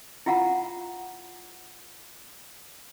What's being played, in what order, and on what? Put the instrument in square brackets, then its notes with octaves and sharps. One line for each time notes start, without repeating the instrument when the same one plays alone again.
[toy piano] E4 F4 F5 F#5 A#5